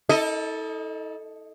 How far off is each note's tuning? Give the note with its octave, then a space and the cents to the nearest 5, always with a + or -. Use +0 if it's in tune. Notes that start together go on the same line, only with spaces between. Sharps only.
E4 -45 A4 +0 D#5 +0